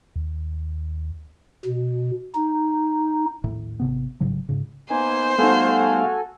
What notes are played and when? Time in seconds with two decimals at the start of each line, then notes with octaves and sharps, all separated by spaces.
0.16 D#2
1.65 B2
2.35 D#4
3.44 A#1 D#2 A2
3.80 G#1 C3 B3
4.20 A1 G#2 C#3 F#3
4.49 G#2 C#3
4.90 A#3 B3 D#4 C5 G#5
5.39 G3 A3 B3 D#4 F#4 A4 F5 G#5